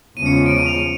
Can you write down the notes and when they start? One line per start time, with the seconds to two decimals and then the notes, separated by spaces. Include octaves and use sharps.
0.16 E2 C#3 F3 G#3 C#4 D#7
0.26 C#7
0.36 C#7
0.46 D7
0.56 D#7
0.66 F7
0.76 D#7